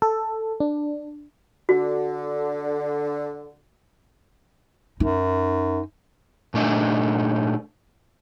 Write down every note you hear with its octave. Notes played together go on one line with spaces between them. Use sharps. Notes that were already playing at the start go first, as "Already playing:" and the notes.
A4
D4
D3 F#4
F#2 D#4
A#2 A3 D4 D#4